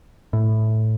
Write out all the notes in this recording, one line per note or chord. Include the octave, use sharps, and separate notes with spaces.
A2